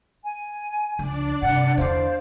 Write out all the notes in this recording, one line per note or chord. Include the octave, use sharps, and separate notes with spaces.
G#5
C#2 F3 D4 D5
G2 C3 F#5
E2 D3 C5 F5